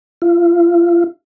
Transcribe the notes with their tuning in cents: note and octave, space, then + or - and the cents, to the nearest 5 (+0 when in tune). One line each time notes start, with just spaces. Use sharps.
F4 -30